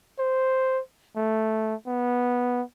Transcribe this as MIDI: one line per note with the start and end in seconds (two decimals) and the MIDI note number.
0.19 0.80 72
1.16 1.74 57
1.87 2.62 59